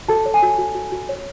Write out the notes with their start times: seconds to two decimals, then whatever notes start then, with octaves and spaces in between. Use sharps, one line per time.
0.08 F#4 A4 A5
0.25 C#5
0.34 G#5
0.42 F#4
0.58 F#4
0.75 F#4
0.92 F#4
1.09 C#5